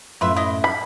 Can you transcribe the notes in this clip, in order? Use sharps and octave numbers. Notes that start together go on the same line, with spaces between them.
F#2 A2 F4 B4 E5
E4 D#5
B5